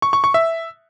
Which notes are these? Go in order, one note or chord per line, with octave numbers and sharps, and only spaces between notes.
C#6
C#6
C#6
E5